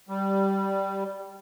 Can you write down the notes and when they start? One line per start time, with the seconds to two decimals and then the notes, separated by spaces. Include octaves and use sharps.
0.09 G3